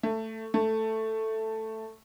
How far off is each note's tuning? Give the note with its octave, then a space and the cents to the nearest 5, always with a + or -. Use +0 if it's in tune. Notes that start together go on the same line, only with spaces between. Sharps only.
A3 +15
A3 +5